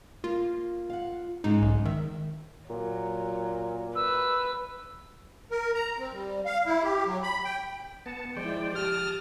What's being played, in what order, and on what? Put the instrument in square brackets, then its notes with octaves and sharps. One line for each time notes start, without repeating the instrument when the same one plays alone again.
[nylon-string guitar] A#3 [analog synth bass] F4
[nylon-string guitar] F5 F#5
[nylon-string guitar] G#2 C#3 [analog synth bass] D#4
[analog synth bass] B1
[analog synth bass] D#3 [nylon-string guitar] E5
[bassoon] A#2 [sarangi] F#3
[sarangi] B4 [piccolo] E6
[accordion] A#4
A#5
C4
G3
F5
E4
G4
F#3
B5
G5
[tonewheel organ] B3 A5 [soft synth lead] C#7
[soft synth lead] F3 [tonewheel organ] G#3 C5 D5 [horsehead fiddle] E4 G5
[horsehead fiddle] G4 [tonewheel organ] A5 D#6 [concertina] F6